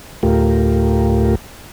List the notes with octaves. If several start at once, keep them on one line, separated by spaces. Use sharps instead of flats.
D2 A2 A3 F4 G4 A#4